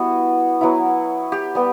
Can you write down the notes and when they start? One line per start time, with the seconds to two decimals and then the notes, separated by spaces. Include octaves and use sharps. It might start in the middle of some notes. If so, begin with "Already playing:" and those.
Already playing: G3 B3 E4 F#4
0.61 F#3 B3 E4
1.32 G4
1.55 G3 B3